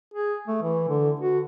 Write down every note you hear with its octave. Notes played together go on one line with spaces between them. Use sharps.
G#4
A3
E3
D3
F#4